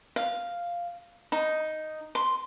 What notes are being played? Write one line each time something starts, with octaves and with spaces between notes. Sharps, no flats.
F5
D#4
C6